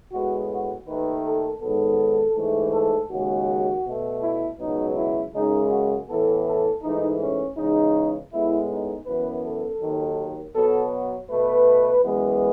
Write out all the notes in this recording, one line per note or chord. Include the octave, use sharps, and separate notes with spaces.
A2 G#3 B3 F#4
F#4
D#2 D#3 A3 B4
A4
G#2 D#3 F#3 B3 A4
G#2 E3 A3
A4
D#2 C#3 G#3 F#4
B2 A3
E4
C#2 B2 F#3 B3 D#4
E4
F#2 C#3 G#3 D#4
F#4
A2 E3 B3 A4
A4
G#2 E3 A3 D#4
C#4
E2 C#3 G#3 D#4
A2 G#3 B3 E4
D#4
F#2 E3 B3 B4
A4
D#2 D#3 F#3
B2 F#3 B3 A4
B2 A3 B4
F#2 E3 G#3 B3